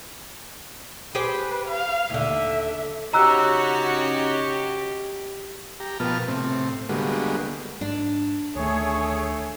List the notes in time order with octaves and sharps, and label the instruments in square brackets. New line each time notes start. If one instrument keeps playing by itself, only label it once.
[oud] G4 G#4 C5 [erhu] B4
[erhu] F5
[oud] D#2 D3 [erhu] E5
[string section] C#3 F#4 C#5 [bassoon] D#4 [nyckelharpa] G4 [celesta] A#5 E6 F#6
[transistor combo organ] G4 A#5
B2 F3 B3 A#4 A5 F6
A2 C3 C4
D3 G3 G#3 A#3 B3 F#4
[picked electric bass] G#2 [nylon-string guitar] D4
[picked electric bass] D2 D#3 [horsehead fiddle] A3 [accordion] G#4 C#5